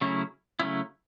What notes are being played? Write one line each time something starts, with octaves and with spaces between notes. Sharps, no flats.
C#3 F#3 A3 C#4 E4
C#3 F#3 A3 C#4 E4